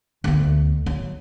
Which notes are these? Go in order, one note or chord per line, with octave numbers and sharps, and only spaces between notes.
D2 B3
F#3